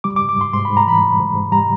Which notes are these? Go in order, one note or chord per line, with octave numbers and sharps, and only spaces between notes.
G3 D6
D6
G#2
D6
G#2 C6
G#2 C6
G#2 B5
A#5
E3 B5
G#2
G#2
G#2
G3 A#5